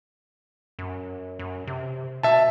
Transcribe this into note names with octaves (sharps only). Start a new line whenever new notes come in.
F#2
F#2
C3
B2 E5 A5